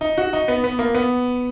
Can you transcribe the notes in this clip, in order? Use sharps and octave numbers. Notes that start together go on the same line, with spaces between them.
D#4
F#4
D#4
B3
B3
A#3
B3